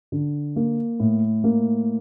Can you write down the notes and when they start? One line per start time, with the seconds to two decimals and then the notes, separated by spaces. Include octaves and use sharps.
0.12 D3
0.56 A#3
1.00 A2
1.44 A#3